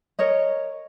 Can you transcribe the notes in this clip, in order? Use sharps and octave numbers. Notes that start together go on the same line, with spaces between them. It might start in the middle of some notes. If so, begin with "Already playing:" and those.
A#4 C#5 D#5